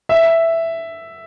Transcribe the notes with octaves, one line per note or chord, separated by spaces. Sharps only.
E5